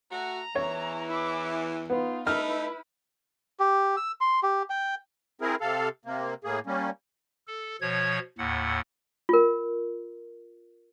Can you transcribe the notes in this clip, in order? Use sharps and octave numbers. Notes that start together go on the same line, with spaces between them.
A3 F#4 A#5
E2 E3 C#5
E4 D6
B3 D#4 F4
A3 D#4 E4 B4 F6
G4
E6
C6
G4
G5
C4 E4 G#4 A#4
C3 A4 F5
C3 A#3
A2 A#3 G#4
G3 A#3 C#4
A4
B2 F3 C#5 G#6
D#2 A2 F#5
F4 A#4